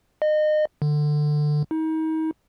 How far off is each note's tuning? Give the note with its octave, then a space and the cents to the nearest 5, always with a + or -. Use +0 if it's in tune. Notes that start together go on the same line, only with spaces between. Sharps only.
D#5 -30
D3 +20
D#4 +35